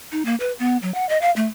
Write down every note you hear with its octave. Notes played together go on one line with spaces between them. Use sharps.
D#4
A#3
B4
B3
F#3
F#5
D#5
F5
A3